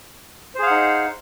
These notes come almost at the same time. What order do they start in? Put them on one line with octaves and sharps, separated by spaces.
C5 G#4 F5 F#5 D#4